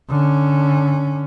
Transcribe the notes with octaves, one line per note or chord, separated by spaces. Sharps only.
D3 C#4